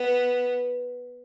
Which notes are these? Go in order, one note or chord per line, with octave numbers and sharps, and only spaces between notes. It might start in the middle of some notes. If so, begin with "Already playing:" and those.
Already playing: B3